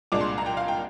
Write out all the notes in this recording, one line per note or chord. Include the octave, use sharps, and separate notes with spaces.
C2 A#2 G#3 D4 D6
C6
A#5
G5
F5
G5